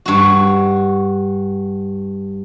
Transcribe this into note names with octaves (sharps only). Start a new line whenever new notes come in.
G2 F#4